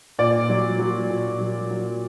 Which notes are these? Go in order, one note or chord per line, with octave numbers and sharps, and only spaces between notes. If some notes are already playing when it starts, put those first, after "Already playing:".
A#2 D5
F#3
F#3
A#2
F#3
F#3